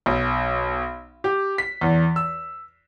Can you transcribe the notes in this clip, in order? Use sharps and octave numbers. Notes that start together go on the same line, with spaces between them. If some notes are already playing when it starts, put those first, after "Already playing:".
B1
G4
B6
E2
E6